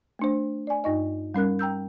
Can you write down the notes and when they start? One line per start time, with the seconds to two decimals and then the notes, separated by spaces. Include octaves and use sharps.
0.19 A3 D4 C5
0.67 D5 G#5
0.84 G2 D#4 D#5
1.34 G3 C#4 A#4 F#6
1.59 G5 A#5 E6 G6